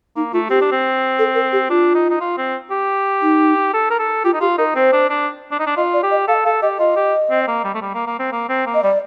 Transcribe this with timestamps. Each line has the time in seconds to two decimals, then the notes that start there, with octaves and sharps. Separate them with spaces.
0.16 A#3 D#4
0.33 A3 F4
0.50 C4 G4
0.61 D4
0.72 C4
1.19 A4
1.35 A#4
1.52 G4
1.69 D4 F4
1.95 D#4
2.10 D#4
2.20 F4
2.38 C4
2.71 G4
3.22 D#4
3.73 A4
3.90 A#4
3.99 A4
4.24 F4 G4
4.33 D#4
4.41 F4 G4
4.58 D#4 A#4
4.75 C4 C5
4.93 D4
5.09 D4
5.51 D4
5.60 D#4
5.67 D4
5.77 F4 D#5
5.94 D5
6.03 G4
6.11 D#5
6.28 A4 F5
6.45 A4 F5
6.62 G4 D#5
6.79 F4 D#5
6.96 G4
7.31 C4
7.48 A#3
7.64 G3
7.74 A3
7.81 G3
7.94 A#3
8.06 A#3
8.19 C4
8.32 A#3
8.49 C4
8.66 A#3
8.74 D#5
8.83 G3 D5